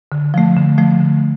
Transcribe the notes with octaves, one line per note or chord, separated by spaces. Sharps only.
D3
F3 A3
D3
F3 A3
D3